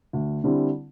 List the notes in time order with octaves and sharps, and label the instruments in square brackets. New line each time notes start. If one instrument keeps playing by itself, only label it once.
[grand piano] D2
D3 G3 C4 E4